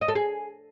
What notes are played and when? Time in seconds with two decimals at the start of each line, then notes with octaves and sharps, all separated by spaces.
0.01 D#5
0.08 A4
0.15 G#4